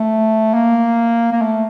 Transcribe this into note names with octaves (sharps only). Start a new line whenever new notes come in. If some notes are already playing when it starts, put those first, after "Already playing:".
Already playing: A3
A#3
A#3
A3